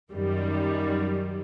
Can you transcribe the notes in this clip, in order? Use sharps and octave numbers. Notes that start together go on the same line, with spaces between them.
F#2 D#3 G3